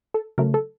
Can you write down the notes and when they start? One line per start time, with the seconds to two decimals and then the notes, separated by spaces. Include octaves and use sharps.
0.14 A4
0.38 C#3 F#3 A3 A#4
0.54 A4